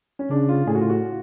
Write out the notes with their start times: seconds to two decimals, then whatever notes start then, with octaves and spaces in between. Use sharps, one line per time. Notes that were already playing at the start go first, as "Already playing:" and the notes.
0.19 C#4
0.30 C#3 D4
0.49 F4
0.66 A2 G#4
0.75 F#4
0.81 F4
0.89 F#4